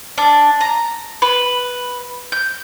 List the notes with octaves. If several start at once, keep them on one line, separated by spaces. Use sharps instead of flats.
D4
A#5
B4
G6